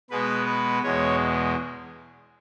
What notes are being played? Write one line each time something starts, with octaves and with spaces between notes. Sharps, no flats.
B2 G#3 B3 B4
B4
E2 B2 G#3 C#5